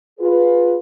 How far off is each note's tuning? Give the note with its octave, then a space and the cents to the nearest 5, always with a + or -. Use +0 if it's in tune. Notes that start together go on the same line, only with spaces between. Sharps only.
F4 +15 G#4 +0 B4 +5